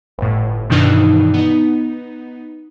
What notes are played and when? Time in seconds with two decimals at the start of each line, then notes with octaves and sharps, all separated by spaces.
0.18 G1 A2
0.70 G2 B2 D#3 E3 D4 D#4
1.34 B3 D#4